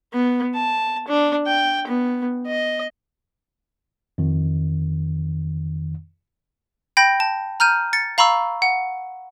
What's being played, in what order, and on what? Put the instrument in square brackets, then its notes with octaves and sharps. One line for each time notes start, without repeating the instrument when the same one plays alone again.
[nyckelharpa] B3
A5
D4
G5
B3
D#5
[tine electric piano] F2 D#3
[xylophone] G5 B5 G6 A#6
A5
A#5 F6 G6 D#7
A6 C#7
F5 A#5 B5 C#6 E6
F#5